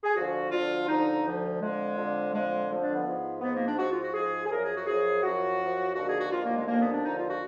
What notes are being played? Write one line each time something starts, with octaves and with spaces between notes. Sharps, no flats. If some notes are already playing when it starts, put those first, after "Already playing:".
G#4
D2 D3 F3 F#4
D2 D3 F3 F4
D2 D3 F3 D#4
D2 D3 F3
F2 D3 F3 G#3
F2 D3 F3
F2 D3 F3 G#3
F2 D3 F3
D4
B3
G#2 F3
G#2 F3 B3
A#3
D4
G#2 F3 F#4
F4
F#4
G#2 F3 G#4
G#4
F#2 F3 A#4
G#4
F#4
F#2 F3 G#4
F#2 F3 F#4
F#2 F3
D#2 D3 F3 F#4
G#4
F#4
D#2 D3 F3 F4
A#3
G#3
D#2 D3 F3 A#3
B3
D4
D#2 D3 F3 D#4
F4
F#4